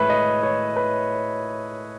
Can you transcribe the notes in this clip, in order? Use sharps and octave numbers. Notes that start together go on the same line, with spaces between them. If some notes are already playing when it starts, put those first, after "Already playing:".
Already playing: A2 G#3 B4 C#5 E5
D#5
C#5
B4